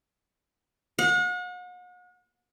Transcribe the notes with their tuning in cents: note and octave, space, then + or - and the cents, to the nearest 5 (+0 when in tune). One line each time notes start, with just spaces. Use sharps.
F#5 -40